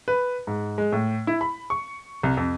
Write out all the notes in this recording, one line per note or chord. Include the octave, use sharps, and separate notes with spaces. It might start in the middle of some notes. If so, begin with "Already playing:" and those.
B4
G#2
G#3
A2
E4
B5
C#6
C2
F2